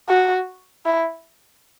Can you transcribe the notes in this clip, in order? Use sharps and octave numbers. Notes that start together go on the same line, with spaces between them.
F#4
E4